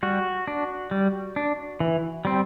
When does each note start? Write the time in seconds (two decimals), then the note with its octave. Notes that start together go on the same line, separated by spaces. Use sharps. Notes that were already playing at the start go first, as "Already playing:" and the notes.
0.03 G3 F#4
0.47 D4
0.91 G3
1.36 D4
1.80 E3
2.25 G3 C4